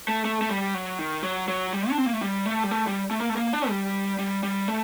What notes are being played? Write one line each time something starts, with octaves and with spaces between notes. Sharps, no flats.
A3
A3
A3
G3
F#3
D#3
F#3
F#3
G3
D4
C4
A#3
A3
G3
A3
G3
A3
G3
A3
A#3
A3
A#3
D4
G3
G3
G3
A3